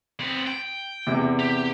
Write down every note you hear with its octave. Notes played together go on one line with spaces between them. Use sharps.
B3 C4
G5
E2 C3
G4